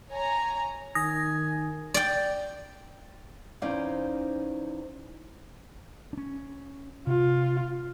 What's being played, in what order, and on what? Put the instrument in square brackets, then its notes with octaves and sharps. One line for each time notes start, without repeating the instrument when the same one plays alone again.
[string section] C#5 G#5 A#5
[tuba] D#3 [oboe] G#5 [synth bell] D#6 A#6
[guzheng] D5 G5
[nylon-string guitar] E2 C#4 D#4 C5 D5 F5
[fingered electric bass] C#4 D4
[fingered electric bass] C3 [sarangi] F4